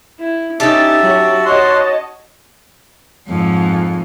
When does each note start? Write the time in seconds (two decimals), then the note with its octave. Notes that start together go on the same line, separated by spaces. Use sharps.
0.19 E4
0.60 C#4 D#4 G4 A4 E5 A5 A6
1.02 F#3 F#4
1.46 C#5 D#5 F#5 A5 C6
3.27 F2 G#2